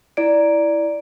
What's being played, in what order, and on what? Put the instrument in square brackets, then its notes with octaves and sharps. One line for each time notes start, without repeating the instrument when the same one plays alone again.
[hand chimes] E4 D5 D7